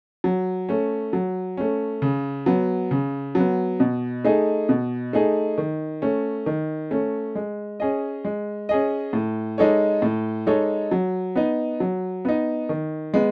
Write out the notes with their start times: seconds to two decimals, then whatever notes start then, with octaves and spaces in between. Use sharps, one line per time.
0.24 F#3
0.69 A3 C#4
1.13 F#3
1.57 A3 C#4
2.02 C#3
2.46 F#3 B3
2.91 C#3
3.35 F#3 B3
3.80 B2
4.25 A3 D#4 G#4
4.69 B2
5.13 A3 D#4 G#4
5.58 D#3
6.02 A3 C#4
6.46 D#3
6.91 A3 C#4
7.35 G#3
7.80 C#4 G#4 D#5
8.25 G#3
8.69 C#4 G#4 D#5
9.13 A2
9.58 G#3 D#4 A4 C#5
10.02 A2
10.47 G#3 D#4 A4 C#5
10.91 F#3
11.36 B3 D#4
11.80 F#3
12.25 B3 D#4
12.69 D#3
13.14 G#3 B3